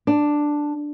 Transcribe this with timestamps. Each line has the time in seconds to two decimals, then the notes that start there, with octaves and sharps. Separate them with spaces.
0.07 D4